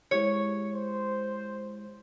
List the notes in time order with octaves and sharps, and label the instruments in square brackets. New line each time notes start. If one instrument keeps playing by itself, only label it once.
[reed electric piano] G#3 E4 G4 [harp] C#5
[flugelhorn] C5